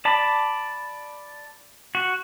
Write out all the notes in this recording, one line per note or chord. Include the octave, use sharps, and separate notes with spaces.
D5 A5 B5
F#4